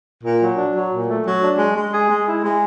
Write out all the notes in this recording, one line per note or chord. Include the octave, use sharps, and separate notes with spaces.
A#2
F#3
D4
F#3
A#2
A3
F#3
D4
G#3
G#3
G#4
G#3
E4
G#3